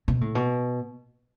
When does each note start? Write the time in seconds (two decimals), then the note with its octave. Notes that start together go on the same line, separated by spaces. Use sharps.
0.08 B2
0.21 A2
0.35 B2